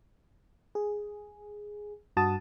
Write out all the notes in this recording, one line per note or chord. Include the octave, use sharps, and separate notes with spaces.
G#4
G2 F#4 A5 D#6